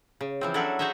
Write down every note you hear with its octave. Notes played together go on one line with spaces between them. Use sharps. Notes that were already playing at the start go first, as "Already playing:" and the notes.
C#3
E3 F3 C4
F#3 C#4 D4 E4 F#4 A4
F#4 G#4 C5 C#5 D#5 E5